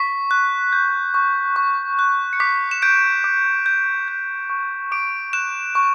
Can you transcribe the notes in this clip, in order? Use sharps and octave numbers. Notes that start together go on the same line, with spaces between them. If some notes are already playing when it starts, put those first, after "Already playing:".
Already playing: C#6 B6
F#6
G6
C#6
C#6
F#6
C#7
D6 B6
E7
G6 D7
D6
G6
G6
C#6
D6 D7
F#6 E7
C#6